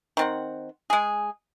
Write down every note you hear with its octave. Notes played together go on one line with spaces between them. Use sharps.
D#3 C4 F#5
G#3 G#4